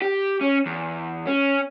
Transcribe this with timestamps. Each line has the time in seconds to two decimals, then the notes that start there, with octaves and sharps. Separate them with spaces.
0.02 G4
0.41 C#4
0.66 E2
1.27 C#4